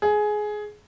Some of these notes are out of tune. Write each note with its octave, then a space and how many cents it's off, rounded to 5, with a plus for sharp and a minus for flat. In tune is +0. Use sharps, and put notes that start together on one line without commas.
G#4 +15